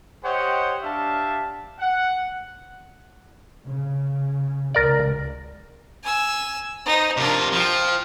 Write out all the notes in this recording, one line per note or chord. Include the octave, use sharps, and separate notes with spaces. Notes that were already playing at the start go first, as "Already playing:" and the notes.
G4 C5 C#5 D#5 F#5
D4 G4 E5 F5 A5
F#5
C#3
C#2 A#4 D5
G#5 E6
D#4 C5
C3 D4 F4 A#4
F3 F4 G5